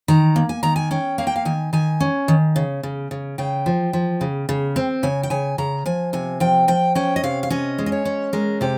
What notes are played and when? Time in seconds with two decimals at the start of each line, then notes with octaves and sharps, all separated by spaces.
0.08 D#3 A#5
0.36 A#3
0.49 G#5
0.63 D#3 A#5
0.76 G#5
0.91 C#4 G5
1.18 A#3 F5
1.27 G5
1.36 F5
1.45 D#3 G#5
1.73 D#3 G#5
2.00 C#4
2.28 D#3
2.56 C#3
2.83 C#3
3.11 C#3
3.38 C#3 G5
3.66 F3
3.93 F3
4.21 C#3
4.49 C#3
4.76 C4
5.03 C#3 G#5
5.23 G5
5.30 C#3 G#5
5.58 C#3 A#5
5.86 F3 G#5
6.13 C3 G#5
6.40 F3 G5
6.68 F3 G5
6.95 C#4 G5
7.16 D#5
7.23 C3 F5
7.43 F5
7.50 C#4 D#5
7.79 G#3
7.86 D#5
7.92 C#5
8.05 C#4
8.33 G#3 A#4
8.61 C3 G4